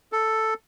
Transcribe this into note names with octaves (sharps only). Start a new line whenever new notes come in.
A4